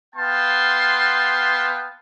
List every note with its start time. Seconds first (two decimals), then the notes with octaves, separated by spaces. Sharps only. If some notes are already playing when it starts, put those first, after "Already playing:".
0.15 B3 F5 G5 A5 C6